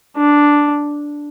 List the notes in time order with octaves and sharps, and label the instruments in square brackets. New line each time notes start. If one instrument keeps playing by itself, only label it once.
[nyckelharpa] D4